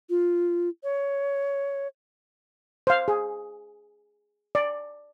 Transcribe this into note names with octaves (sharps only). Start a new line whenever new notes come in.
F4
C#5
C5 F5
G#4
D5